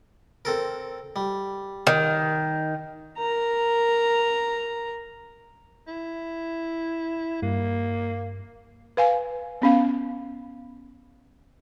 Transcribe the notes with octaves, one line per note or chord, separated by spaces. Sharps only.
C4 A4 A#4
G3
D#3
A#4 A#5
E4
G2 A#3
B4 F5 G#5
B3 C#4 F5